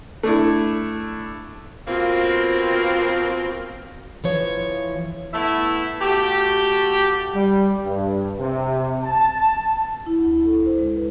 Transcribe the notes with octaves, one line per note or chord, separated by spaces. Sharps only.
A3 D4 E4
B2 A#3 C4 F4
E3 F3 C#5
A3 B3 E4
A3 F#4 G4
G3
G2
C3
A5
E4
D2
E4
A4
C5
G#3
B4